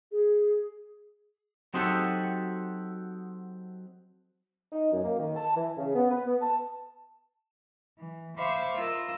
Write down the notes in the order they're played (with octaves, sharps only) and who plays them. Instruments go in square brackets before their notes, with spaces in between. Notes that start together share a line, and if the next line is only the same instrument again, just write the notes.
[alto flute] G#4
[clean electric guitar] F#3 C4 D#4 F#4 G4 A4
[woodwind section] D#4
F#2
A#3
D#3
A5
E3
C#3
B3
B4
B3
A5
[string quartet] E3
C5 E5 F5 B5 C#6 D6
F4 A#4 D#5 E6